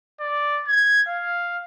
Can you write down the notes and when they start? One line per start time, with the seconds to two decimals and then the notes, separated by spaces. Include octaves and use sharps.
0.20 D5
0.68 G#6
1.08 F5